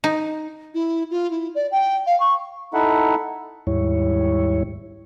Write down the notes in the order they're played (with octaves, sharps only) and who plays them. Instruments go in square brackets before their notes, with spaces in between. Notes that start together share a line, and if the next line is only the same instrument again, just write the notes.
[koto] D#4
[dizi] E4
F4
E4
D5
G5
F5
C#6
[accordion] D#4 E4 A4 E5 F#5
[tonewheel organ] D#2 G#2 G3 E4 C#5